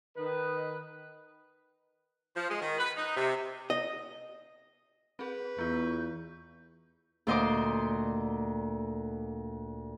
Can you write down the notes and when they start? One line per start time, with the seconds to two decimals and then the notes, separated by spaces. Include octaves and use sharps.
0.17 D#3 B4 D#5
2.35 F3
2.49 G#3
2.62 D#3
2.78 B4
2.96 D#4
3.16 C3
3.70 D#5
5.19 C4 G#4 B4
5.58 E2 B3 F4 C#6 G6
7.27 D2 A#2 C5 D#5 C6 D6